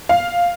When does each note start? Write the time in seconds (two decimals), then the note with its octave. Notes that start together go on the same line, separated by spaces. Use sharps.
0.09 F5